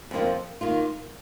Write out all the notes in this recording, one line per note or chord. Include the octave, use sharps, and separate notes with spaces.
F2 F3 A#3 F4
D#3 A#3 F4